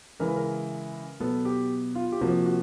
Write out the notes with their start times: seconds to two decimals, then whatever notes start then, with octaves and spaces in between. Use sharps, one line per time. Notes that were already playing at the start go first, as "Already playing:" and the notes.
0.20 C#3 E3 G#3 A#4
0.28 B4
0.36 A#4
1.20 B2 F#3 B3 A4
1.45 G4
1.95 F4
2.12 G4
2.21 C3 F3 A#3 F#4
2.46 F#4